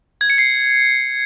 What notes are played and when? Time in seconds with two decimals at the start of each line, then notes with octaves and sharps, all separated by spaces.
0.21 G#6
0.30 C#7
0.38 C7